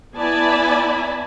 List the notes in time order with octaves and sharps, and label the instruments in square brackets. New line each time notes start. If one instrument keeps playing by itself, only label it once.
[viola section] B3 E4 D5 G#5 A5 B5